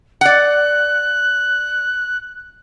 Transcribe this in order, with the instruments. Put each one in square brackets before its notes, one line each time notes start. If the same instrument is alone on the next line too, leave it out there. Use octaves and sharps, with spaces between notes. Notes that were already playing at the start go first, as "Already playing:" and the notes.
[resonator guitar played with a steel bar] D5 F#5 [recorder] F#6